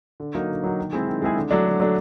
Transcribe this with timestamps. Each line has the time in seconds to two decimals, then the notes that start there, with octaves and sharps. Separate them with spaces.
0.20 D3
0.35 F#3 A#3 D#4 F#4
0.50 D3
0.64 F#3 A#3 D#4 F#4
0.78 D#3
0.93 G#3 C4 E4 G#4
1.07 D#3
1.22 G#3 C4 E4 G#4
1.36 D3
1.51 F#3 A3 D4
1.66 D3
1.80 F#3 A3 D4